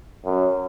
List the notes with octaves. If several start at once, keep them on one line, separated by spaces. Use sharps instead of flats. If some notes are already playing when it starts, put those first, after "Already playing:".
F#2